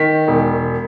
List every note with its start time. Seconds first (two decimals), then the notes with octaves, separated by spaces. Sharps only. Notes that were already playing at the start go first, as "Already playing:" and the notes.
Already playing: D#3 B6
0.28 E1